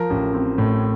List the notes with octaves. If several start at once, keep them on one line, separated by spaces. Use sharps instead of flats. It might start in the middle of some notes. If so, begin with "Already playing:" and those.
Already playing: F3 A#4
A1
C4
A2